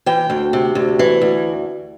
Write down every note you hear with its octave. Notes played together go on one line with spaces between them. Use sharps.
E3 G5
D2
C3
D2
E3
D2